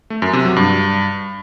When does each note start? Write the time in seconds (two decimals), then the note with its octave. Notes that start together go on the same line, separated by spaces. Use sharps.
0.10 A3
0.22 F#2
0.33 C3
0.45 F#3
0.56 G2